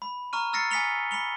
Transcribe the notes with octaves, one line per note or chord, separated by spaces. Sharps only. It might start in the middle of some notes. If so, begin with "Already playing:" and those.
B5
A#5 C#6 F6 D#7
E6 F6 A6 A#6 C7 C#7
G#5 D#6 B6 C#7 F7 G7
B5 C#7 F7 G7